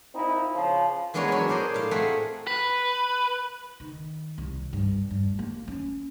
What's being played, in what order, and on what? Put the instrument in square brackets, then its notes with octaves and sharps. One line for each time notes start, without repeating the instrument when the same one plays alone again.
[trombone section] A#2 C4 D#4 E4
C#3 F3
[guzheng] E3 G#3 B3 D4 A#4 C#5
F#3 C#5
G#4 A#4 C5 D5 D#5
A2 F5
A3 C4 G#4 A#4 E5 F#5
[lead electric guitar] B4
[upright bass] D#3
C2
G2
G2
A#3
C#4